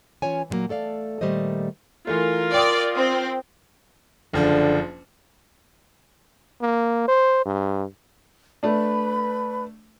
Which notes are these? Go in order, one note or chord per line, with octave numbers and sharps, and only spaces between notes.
E3 C#4 F4 C#5 G#5
A#2 D3 F#3 A#3
A3 A4 D5 F5
A#2 D#3 G3 A3 C5 D#5
E3 A3 F4 A#4
D5 G5 D#6
C4
F#1 D3 F3 D4
A#3
C5
G2
A3 D4 B4 B5